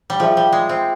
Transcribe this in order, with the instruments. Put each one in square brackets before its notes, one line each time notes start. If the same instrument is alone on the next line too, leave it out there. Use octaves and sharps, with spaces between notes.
[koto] G3
[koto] F3 [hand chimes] F4 G#4 E5 G5
[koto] G3
G#3
C4